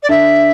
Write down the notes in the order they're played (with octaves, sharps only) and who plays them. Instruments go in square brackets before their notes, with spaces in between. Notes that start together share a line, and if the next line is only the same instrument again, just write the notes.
[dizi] D5
[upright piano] D3 D4 [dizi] E5